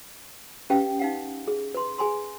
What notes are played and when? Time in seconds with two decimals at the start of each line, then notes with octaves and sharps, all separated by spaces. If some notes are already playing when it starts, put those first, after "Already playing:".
0.70 C#4 G4 B4 F5 G5
0.99 D#4 F5 F#5
1.48 G#4
1.74 B4 C6
1.98 G#4 G#5 B5 C6